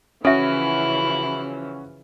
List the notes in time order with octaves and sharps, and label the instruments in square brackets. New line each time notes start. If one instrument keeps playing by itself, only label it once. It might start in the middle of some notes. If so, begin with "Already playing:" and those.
[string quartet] C#3 E3 F3 [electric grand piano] C#4 F#4 [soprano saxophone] E4 [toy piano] A4 E5